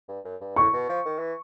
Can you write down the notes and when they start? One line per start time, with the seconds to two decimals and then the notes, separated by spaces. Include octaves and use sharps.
0.09 G2
0.25 F#2
0.41 G2
0.56 A2 C#6
0.73 B2
0.89 F3
1.05 D#3
1.19 E3